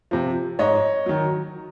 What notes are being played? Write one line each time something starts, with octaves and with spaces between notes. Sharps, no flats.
C3 F3
G#2 C#5 D#5
D#3 F#3